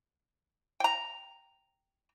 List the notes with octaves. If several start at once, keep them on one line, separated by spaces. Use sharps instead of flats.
G5 A#5